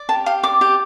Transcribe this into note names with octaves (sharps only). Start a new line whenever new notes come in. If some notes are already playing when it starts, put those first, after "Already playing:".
Already playing: D5
G4 A5
G4 F5
D5 D6
G4